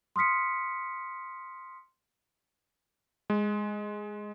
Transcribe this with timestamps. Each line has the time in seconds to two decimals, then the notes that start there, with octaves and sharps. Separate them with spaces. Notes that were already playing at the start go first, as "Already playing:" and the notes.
0.16 C6 D#6 F6 B6 C#7
3.30 G#3